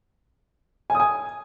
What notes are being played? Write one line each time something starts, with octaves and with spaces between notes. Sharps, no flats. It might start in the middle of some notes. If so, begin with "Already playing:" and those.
G#5
D#6
G#5